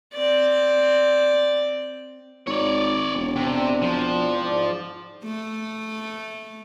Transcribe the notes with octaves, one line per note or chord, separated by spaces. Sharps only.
C4 D5
G#1 C#5 D5
E1
C3 C4 D4
F3
G#2 D5
A3